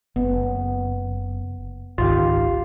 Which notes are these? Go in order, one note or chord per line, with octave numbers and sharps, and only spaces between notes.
F#1 B3
G#1 C#2 D#3 F4 G4 F5